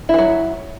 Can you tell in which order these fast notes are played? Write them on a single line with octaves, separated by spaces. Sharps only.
E4 E3 F#3